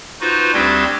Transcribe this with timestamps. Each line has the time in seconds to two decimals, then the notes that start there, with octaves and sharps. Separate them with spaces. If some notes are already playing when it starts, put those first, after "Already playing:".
0.21 D#4 F4 F#4 B4 C5
0.53 D2 G3 C4 D4 G4 G#6